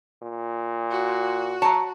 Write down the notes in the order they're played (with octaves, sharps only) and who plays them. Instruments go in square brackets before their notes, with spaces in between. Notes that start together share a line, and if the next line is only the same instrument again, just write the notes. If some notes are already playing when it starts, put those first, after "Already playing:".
[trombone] A#2
[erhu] F#4
[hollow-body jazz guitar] C#5 A#5 [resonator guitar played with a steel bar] A5